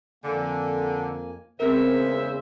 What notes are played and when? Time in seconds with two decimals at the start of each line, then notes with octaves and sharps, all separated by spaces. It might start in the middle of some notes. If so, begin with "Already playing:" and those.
0.24 F2 D3 A#3 G#5
1.60 E2 C#3 G#3 B3 C4 A#4 C5 E5